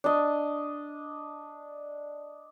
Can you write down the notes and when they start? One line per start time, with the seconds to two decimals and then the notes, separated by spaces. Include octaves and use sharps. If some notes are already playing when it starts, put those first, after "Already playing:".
0.04 D4 D#5